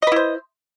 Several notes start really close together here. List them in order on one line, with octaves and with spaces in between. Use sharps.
D#5 B4 E4 C5